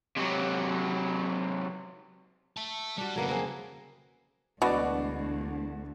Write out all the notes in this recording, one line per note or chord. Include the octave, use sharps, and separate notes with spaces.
C3 F#3
E5 A5
G3 D4 F#4
F2 C#3 F#3 A#3 B3
A#3 C4 G#4
E1 D2 B2 F#4 D5